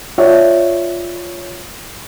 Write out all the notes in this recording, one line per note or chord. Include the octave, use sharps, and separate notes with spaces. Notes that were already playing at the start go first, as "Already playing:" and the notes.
F4 C#5 D5 E5